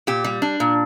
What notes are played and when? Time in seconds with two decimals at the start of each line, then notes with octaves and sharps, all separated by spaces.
0.07 A#2 G4
0.24 G3
0.42 D4
0.60 A#2